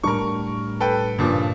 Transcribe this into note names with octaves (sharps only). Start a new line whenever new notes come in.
A2 G3 D4 A#4 C#6
A4 B4 G5
G2 A#2 C#3 F3